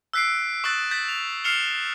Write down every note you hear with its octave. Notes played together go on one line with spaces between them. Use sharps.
E6 F#6 B6 C7 D7
C#6 D#6 E6 F#6 A6
G6 A6 B6
F7
F6 C7 C#7 E7 F7 G7